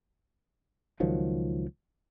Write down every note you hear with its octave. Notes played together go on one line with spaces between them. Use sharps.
C#2 D#3 F3 F#3